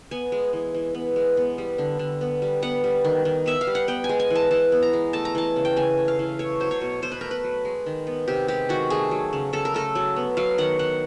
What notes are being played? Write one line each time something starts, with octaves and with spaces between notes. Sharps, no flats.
B3 G#5
G#3
E3
E3
B3
G#3
B3
G3
D3
D3
B3
G3
B3 F#5
G3
D#3
D#3
B3 E5
F5
G3
F#5
B3 G5
G#5
G#3
G#5
E3
A5
E3 A5
B3
A#5
G#3
A3 A5
A#5
E3 A5
C#3
G5
C#3 G#5
A3
F5
E3
A3 C#5
F#3 C5
C#5
B2
B2 C5
B4
A3 A#4
B4
F#3
G#3
D#3
B3
C3 G4
G#3 G4
D#3 F#4
A3 G#4
F#3
C#3
C#3 A4
A#4
A3 A4
F#3
B3
F#3 F5
D#3 F#5
D#3 F#5